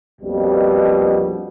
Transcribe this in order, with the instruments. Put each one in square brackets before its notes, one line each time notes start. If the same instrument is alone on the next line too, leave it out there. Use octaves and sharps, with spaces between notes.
[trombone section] A#1 F2 B2 G3